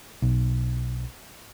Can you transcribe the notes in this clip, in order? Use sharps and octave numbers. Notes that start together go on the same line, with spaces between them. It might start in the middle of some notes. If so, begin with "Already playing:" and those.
B1